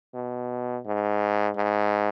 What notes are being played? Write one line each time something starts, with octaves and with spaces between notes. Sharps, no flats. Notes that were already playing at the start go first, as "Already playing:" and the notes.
B2
G#2
G#2